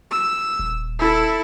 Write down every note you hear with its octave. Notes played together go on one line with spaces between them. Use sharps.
E6
D#1
E4 A4